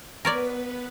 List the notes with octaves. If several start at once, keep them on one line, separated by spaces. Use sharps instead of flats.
B3 A#4 B4 C#5 D5